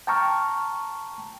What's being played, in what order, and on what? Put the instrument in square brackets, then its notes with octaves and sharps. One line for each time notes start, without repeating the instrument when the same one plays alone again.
[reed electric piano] G5 A5 A#5 C#6 F6